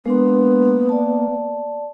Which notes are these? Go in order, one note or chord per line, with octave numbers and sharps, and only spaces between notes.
G#3 A#3 B3 D4 C6
D5 A5